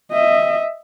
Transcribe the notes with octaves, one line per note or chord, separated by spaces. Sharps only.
D#5 E5